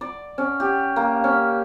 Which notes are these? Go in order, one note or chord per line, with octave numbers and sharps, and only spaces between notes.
D5
C#4
G4
A#3
C#4